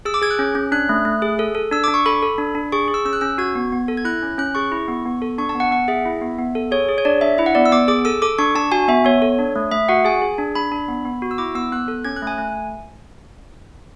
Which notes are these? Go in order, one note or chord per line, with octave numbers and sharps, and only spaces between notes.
G#4 E6
D6
G#4 G#6
F#6
C#4
C#4
D4 F#6
A3
A3
G#4
A4
A4
D4 E6
D4 D6
C#6
A4 B5
A4
D4
D4
G#4 C#6
G#4
E6
C#4 E6
F#6
C#4 E6
F#4 G#6
B3
B3
A4
G#6
E4 F#6
C#4
C#4 F#6
G#4 C#6
E4
B3
B3
A4
D4 C#6
A5
B3
F#5
B3 F#5
G#4 E5
E4
B3
B3
A4
G#4 C#5
G#4
C#5
D4 D5
D4 E5
E4 E5
F#5
B3 D5
E6
B3 D6
G#4 D6
A4 E6
A4 D6
D4 C#6
D4 A5
F#4 G#5
B3 E5
B3 C#5
A4
D4
A3
A3 E5
F#4 F#5
G#4 G#5
G#4
D4
D4 B5
D4
B3
B3
F#4
E6
E4 D6
B3 E6
B3 F#6
A4
C#4 G#6
F#6
A3 G#5
A3